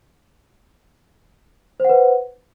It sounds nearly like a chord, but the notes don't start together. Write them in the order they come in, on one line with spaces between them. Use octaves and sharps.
C5 F#5 B4